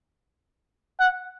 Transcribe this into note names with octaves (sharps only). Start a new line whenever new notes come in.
F#5